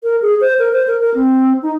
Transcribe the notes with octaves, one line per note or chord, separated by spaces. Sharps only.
A#4
G#4
C5
A#4
C5
A#4
A#4
C4
D#4